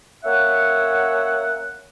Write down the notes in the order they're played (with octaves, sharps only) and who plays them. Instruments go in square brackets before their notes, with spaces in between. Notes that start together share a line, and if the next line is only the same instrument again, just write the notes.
[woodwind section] A#3 C#4 C#5 E5 F#5